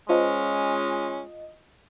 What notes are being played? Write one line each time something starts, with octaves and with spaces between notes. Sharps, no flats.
G#3 C#4 F4 C5 D#5 A5